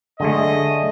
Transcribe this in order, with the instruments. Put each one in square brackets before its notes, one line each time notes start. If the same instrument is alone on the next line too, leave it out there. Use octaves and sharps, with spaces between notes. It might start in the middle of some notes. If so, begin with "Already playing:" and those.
[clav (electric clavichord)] D3 G#3 A3 [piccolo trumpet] D#5